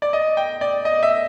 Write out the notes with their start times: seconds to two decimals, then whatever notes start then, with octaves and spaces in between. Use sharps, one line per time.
0.02 D5
0.13 D#5
0.37 G5
0.61 D5
0.85 D#5
1.03 E5